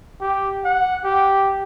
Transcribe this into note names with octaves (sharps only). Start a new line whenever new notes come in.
G4
F#5
G4